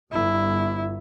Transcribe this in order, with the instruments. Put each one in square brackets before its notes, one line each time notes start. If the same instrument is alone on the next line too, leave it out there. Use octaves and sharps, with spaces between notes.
[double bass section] G1 [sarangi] E4